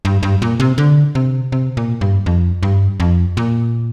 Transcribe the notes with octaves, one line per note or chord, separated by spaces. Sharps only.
G2
G2
A#2
C3
D3
C3
C3
A#2
G2
F2
G2
F2
A#2